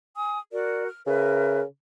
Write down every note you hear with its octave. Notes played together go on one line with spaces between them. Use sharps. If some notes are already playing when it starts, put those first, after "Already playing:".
G#5 D#6
F#4 A#4 D5
F6
C#3 A#4 B4 E5